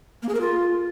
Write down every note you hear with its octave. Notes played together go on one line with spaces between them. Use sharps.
A#3
G#4
A#4
F4